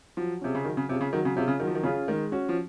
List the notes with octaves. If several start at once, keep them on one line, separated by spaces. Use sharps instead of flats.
F3 F#3
C3 C#4 F4 G#4
C#3
D#3 F#3
C#3
C3 C#4 F4 G#4
C#3
D#3 F#3
C#3
C3 C#4 F4 G#4
C#3
D#3 F#3
F3
D#3
C#3 C#4 F4 G#4
D#3 G#3
C#4 F#4
F3